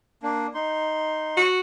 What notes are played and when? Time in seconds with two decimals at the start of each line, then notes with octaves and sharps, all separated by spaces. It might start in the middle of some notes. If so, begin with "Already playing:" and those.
0.23 A#3 D4
0.54 D#4 C6
1.37 F#4